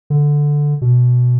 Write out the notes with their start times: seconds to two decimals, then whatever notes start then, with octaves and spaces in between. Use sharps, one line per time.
0.10 D3
0.81 B2